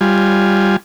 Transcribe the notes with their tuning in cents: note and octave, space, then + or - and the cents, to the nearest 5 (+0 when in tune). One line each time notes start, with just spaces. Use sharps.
G3 +0 F4 +0 G#5 +0